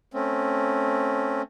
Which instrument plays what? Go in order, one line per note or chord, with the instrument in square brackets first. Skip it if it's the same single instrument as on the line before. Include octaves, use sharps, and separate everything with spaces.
[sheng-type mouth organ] A3 C4 C#4